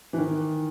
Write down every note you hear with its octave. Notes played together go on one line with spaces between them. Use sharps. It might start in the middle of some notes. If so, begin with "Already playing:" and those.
E3
D#3